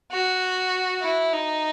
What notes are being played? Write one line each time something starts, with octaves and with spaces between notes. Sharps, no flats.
F#4
E4
D#4